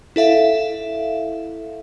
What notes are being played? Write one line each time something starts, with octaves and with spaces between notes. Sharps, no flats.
E4 A4 E5 F5